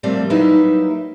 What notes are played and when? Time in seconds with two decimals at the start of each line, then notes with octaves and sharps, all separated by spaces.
0.03 F3 G3 A3 A#3 C4 D5
0.30 F#3 G3 A#3 D#4 E4 B4